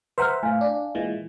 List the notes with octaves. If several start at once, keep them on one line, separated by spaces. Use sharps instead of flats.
B4 C5 E5 F#5 A#5 F6
A2 F5 G#5
D4
A#2 E3 G#3